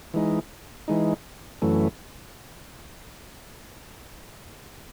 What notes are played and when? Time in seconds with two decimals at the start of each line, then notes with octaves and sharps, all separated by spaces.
0.14 E3 G#3 D#4
0.88 E3 G#3 D#4
1.62 F#2 E3 A3